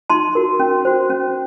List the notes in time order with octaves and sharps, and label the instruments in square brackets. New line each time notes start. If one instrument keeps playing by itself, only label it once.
[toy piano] D#4 A5 C6
F#4 A#4
C#4
F#4 C5
C#4